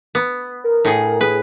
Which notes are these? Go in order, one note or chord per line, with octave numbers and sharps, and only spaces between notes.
B3
A#4
A2 G#4
G#4 B4